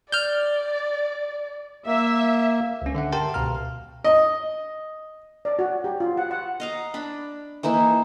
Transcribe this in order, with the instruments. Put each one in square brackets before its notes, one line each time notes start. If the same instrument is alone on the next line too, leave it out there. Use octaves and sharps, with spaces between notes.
[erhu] D5 [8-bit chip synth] F6 G6
[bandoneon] A#3 [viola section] E5
[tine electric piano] C#2 C#4
D3 E5 F#5
G4 A#4 G5 A5 C6
C#2 B2 F5 A#5 F6
[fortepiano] D#5
[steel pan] D5
F#4
G4
F4
F#5
F#5
[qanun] D#5 F5 A#5
D4 B5
E3 A#3 D#4 E5